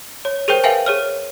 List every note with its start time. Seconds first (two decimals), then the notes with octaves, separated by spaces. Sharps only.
0.25 C#5
0.48 G#4 A#4 C5 G5 G6
0.64 A#4 B4 E5 F5 G5 G#5
0.86 G#4 C#5 F6